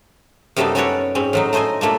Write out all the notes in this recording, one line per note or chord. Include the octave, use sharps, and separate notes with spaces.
F#2 C3 G3 A3 B3 D#4
C#4 F#4 A4 B4 C#5 D5
G#2 C4 C#4
A2 F#3 D#4
A3 D#4 C5 D#5 G#5
A#2 A3 A#3 D4